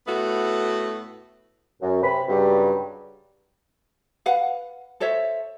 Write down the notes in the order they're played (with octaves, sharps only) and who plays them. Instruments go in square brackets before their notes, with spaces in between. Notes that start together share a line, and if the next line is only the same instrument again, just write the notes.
[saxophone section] A2 A3 B3 F#4
[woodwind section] F#2
C3 B5
G2 C#3 F#3 G3
[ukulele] B4 F5 F#5
A4 C5 C#5 E5